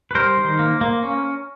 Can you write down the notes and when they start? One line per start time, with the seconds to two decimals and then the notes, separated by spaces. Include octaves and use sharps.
0.11 B4
0.15 G3 A#4 C5
0.37 D#3
0.59 A#3
0.81 A#3
1.03 C#4